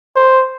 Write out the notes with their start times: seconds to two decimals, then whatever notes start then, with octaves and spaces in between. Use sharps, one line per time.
0.16 C5